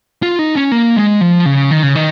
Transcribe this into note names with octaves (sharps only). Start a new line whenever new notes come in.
F4
D#4
C#4
A#3
G#3
F3
C#3
D#3
C#3
D#3